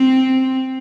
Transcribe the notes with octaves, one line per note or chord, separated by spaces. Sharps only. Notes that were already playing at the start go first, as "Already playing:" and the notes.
Already playing: C4